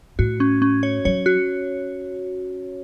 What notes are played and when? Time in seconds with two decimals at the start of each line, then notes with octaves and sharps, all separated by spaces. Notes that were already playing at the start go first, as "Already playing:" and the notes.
0.19 A2 F#4
0.40 C#4
0.62 C#4
0.83 C#5
1.05 F#3 C#5
1.26 F#4